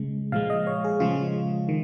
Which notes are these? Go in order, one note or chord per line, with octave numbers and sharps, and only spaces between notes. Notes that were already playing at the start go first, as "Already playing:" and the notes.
Already playing: C#3 G#3
A#2 F3 G#3 F5
D#5
C#5
G#4
C#3 F3 G#3 F4
D#3